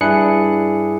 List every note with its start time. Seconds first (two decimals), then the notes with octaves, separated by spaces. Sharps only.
0.01 G2 D4 E4 G#4 F#6 C#7